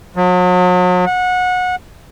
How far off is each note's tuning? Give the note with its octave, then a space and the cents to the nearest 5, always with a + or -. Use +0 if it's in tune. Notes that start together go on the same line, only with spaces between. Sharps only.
F#3 -40
F#5 -25